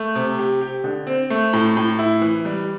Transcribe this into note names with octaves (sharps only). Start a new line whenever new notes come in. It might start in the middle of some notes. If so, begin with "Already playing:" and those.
Already playing: A3
C3
G4
G4
D3
C4
A3
A2
A2
E4
E3
G3